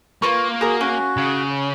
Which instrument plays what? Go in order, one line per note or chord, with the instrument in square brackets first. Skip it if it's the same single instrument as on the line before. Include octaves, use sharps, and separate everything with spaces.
[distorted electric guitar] A#3 [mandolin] F4 B4 C#6
[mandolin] F#4 A#4 [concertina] G#4
[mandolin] C#4 [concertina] F#4
[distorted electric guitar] C#3